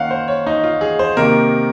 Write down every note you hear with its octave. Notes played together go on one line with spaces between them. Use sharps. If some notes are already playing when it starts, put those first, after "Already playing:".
Already playing: D#3 A#3 C#4 F5 F#5
C5
C#5
D#4
F4
G#4
C5
C3 D#3 A#3 A#4